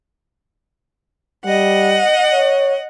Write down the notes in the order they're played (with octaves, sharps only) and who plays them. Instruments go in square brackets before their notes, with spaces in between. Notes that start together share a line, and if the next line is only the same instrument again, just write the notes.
[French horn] G3 [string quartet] D#5 F#5
[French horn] C#5